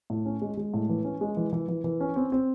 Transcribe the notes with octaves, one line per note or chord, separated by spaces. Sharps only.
A2
C#4
G#3
G#3
A2
E3
C#4
G#3
E3
E3
E3
E3
C#4
C4
C4